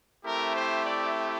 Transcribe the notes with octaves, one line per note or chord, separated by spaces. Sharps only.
A3 C4 E4 G4 A#4
C5
D5